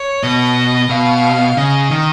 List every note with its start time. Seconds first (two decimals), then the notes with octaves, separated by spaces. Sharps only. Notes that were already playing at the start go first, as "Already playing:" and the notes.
Already playing: C#5
0.23 B2 D#5
0.89 B2 F5
1.57 C#3 D#5
1.91 D#3